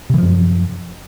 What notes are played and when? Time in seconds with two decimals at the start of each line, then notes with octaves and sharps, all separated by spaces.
0.10 C3
0.14 E3
0.18 F3
0.22 F#2